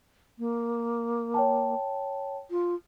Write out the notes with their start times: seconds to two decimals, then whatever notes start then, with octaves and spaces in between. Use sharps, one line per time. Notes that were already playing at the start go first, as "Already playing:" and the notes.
0.39 A#3
1.34 C#5 G5 A5
2.51 F4